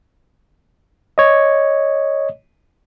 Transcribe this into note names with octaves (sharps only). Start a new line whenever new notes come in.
C#5 D#5